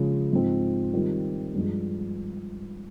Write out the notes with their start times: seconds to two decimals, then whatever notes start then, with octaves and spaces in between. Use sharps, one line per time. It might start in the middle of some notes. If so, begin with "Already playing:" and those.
Already playing: C#3 F3 G#3
0.32 G#2 F3 C4
0.93 D#3 G3 C4 F4
1.54 G2 F3 G#3